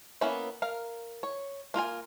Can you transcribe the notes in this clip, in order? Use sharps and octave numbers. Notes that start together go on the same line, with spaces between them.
A#3 B3 C#4 E4 E5
A#4 F5
C#5
A#3 F4 A#4 G#5